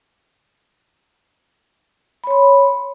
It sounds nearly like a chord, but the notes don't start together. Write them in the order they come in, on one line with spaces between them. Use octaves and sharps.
B5 C#5 C6